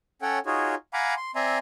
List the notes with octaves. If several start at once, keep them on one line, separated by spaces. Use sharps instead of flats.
C#4 A4 C#5 F#5 G5
D#4 F4 F#4 G#4 C#5
F5 F#5 G#5 A#5 B5 D6
C6
C4 D5 E5 G#5 A#5 C6